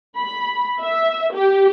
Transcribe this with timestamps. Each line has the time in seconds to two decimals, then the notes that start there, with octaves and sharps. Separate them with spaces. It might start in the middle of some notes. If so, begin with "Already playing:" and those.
0.19 B5
0.81 E5
1.34 G4